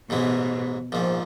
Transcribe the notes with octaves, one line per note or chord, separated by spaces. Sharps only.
A1 G#2 B2 E3 G#3
A#1 G#2 F3